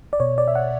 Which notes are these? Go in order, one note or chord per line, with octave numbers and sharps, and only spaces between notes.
D5
B2 C#5
D5
E5
F#5